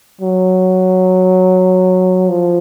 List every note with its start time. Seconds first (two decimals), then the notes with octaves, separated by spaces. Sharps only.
0.21 F#3
2.29 F3